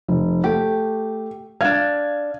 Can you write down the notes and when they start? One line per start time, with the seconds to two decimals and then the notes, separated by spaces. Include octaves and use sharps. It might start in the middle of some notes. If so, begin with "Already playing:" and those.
0.08 F1
0.44 A3 G4
1.61 D4 D#4 F5 G#6